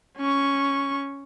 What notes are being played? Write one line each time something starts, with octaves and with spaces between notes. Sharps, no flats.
C#4 C#6